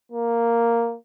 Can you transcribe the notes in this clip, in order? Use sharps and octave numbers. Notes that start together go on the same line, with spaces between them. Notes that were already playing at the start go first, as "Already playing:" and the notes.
A#3